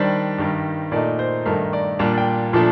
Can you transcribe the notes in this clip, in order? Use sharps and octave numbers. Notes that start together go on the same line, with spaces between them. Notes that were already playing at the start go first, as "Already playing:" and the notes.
Already playing: D#3 G3 D4 C5
G2 D#3 G3
A#2 A3 D#4 D5
C5
G2 D#3 A3 D#4 A#4
D5
A#2 G3 D4 F4 F5
G5
A#2 F3 A3 D4